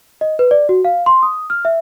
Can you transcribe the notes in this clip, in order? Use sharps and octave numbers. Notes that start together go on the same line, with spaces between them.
D#5
B4
D5
F#4
F5
C6
D#6
F6
E5